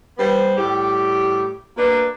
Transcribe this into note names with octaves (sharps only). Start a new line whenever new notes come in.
G3 B3 B4 C5
A2 G3 G4
A#3 B3 D4 F#4 B4